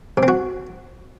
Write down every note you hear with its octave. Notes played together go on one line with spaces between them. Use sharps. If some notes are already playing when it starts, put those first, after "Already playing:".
C3
C4
F#4